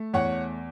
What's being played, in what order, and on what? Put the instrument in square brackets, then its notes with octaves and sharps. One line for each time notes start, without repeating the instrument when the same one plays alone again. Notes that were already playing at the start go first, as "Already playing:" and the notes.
Already playing: [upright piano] A3
E2 C#5 F#5